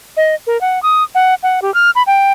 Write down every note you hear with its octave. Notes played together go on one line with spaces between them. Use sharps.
D#5
A#4
F#5
D#6
F#5
F#5
G4
F6
B5
G5